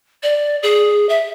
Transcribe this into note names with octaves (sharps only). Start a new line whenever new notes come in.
D5
G#4
E5